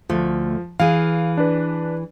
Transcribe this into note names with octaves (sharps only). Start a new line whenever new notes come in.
D2 F3 A3
E3 G#4 F5
D4 B4